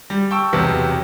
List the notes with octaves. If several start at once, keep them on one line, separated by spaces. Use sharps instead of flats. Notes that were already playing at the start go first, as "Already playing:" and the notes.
G3
G5 A5 C#6 E6
B1 E2 C3 B3